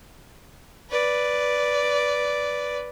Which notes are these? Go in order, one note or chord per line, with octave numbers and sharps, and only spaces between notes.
B4 D5